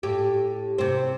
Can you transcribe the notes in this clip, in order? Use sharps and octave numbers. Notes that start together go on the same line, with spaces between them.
A2 G4
C3 C4